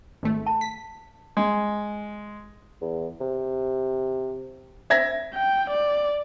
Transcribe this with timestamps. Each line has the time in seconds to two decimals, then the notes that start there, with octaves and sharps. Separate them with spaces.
0.23 G#1 A3
0.47 A5
0.61 B6
1.37 G#3
2.81 E2
3.21 C3
4.90 C4 E5 G#6 A#6
5.34 G5
5.70 D5